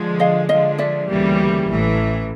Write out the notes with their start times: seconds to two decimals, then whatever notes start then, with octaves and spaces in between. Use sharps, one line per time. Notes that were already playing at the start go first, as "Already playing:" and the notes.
Already playing: D3 F3 G#3
0.20 D#5 F5
0.49 D3 F3 G#3 D#5 F5
0.78 D5 E5
1.08 D2 C#3 E3 G3 A#3
1.67 A1 A2 E3